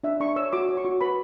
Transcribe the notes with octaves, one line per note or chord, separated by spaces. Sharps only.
D4 E5
D4 C#6
C#5 E6
F#4 D6
C#5
C#6
F#4
B4 B5